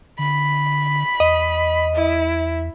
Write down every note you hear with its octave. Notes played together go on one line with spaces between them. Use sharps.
D3 B5
E2 D#5
E4